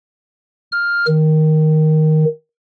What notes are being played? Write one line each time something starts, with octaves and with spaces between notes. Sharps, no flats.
F6
D#3